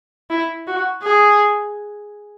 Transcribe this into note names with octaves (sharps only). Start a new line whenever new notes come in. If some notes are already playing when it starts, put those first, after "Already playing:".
E4
F#4
G#4